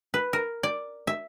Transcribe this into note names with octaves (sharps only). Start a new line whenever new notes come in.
B4
A#4
D5
E5